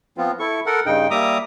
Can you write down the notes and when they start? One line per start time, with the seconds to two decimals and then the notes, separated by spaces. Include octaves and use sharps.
0.18 F3 B3 C4 F4
0.40 E4 A4 C#6
0.66 A4 A#4 F#5
0.86 G2 C#3 D#4 G5
1.11 G3 A#3 E5 A#5 D6 D#6